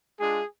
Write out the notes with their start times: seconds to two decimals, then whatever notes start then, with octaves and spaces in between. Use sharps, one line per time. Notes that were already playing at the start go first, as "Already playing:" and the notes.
0.19 G#3 D4 F4 G#4